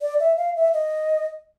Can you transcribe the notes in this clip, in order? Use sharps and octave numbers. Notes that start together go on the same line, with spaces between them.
D5
E5
F5
E5
D#5